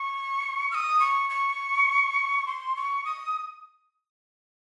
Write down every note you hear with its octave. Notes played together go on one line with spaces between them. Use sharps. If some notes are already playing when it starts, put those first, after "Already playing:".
Already playing: C#6
F6
D#6
C#6
C#6
C6
C#6
D#6